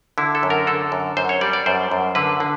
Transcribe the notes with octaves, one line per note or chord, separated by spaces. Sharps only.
D3 E4
A4
F#2
A#4
D3 A4
F#2
F#2 C5
C#5
G3 D5
D5
F#2 C5
F#2
D3 B4
D3